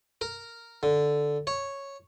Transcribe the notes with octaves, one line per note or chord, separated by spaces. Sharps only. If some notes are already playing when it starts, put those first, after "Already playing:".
A#4
D3
C#5